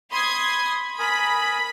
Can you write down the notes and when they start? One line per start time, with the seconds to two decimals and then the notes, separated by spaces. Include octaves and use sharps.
0.12 B5 C6 D#6 G#6
0.99 A#4 G#5 B5 D#6 B6